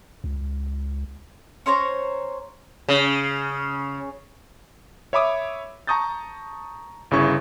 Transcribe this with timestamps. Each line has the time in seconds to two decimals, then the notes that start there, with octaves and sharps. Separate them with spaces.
0.24 C#2
1.66 C#4 C5 C#5 A#5
2.89 C#3
5.13 C#5 E5 B5 D6 D#6
5.87 A5 A#5 C#6 D#6 G6 A6
7.11 G1 C#3 E4 C#6 G#6